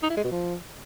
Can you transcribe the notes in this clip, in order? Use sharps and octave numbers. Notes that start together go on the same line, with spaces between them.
D#4
E4
G#3
B2
F3